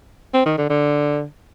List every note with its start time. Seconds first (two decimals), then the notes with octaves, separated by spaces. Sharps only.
0.34 C4
0.46 D#3
0.58 D3
0.70 D3